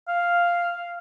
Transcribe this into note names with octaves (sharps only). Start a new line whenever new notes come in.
F5